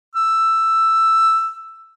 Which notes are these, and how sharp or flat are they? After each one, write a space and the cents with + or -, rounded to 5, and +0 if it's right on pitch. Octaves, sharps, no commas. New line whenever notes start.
E6 +5